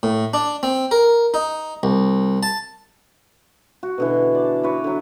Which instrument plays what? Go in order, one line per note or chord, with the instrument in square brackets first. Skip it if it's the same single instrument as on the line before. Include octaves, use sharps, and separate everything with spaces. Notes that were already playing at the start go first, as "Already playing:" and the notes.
[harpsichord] A2
D4
C4
A#4
D#4
C2
A5
[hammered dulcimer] F#4
B2 D3 E3
D5 A5
E4 F#4 B4 C#5
D3 F#3